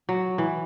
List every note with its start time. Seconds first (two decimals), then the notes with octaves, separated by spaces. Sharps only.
0.09 F#3
0.38 E3